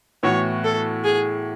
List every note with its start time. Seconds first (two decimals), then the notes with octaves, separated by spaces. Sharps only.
0.23 A2 E3 B3 F#4 C#5
0.64 A4
1.04 G#4